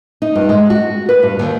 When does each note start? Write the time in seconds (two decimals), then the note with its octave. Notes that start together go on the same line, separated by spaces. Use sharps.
0.22 D#4
0.35 G2
0.49 G#3
0.70 F#4
1.09 B4
1.23 G2
1.39 D#2